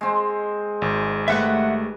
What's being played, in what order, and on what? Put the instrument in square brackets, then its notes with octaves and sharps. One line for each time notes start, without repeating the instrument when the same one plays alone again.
[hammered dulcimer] G#3 C4
[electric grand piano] G#1
[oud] A3 G4 [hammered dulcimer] B4 [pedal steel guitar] E5 F#5 F#6